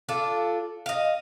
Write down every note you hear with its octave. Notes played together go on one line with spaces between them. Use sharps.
D4 F4 A4
D#5 F5